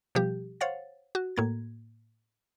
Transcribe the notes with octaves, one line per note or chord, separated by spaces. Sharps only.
B2 F3 G3 G4
C5 C#5 F5 F#5 A6
F#4
A2 A#3 G#6